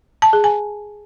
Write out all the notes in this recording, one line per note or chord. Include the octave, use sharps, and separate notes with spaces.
A5
G#4
G#5